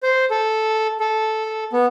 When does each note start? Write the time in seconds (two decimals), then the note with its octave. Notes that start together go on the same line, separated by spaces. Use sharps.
0.03 C5
0.31 A4
1.00 A4
1.73 B3